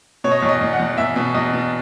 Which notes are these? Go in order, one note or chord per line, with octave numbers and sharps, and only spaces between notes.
B2 C#5
D#5
E2 C#5
D#5
E2
F#5
E2
E2 E5
B2
E2 D#5
B2